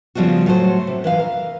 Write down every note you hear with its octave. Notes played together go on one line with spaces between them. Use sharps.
C#3 F3 G3 B3 F#4
A2 F#3 A3 F#4 C5
C3
E3 B4 F5
A#4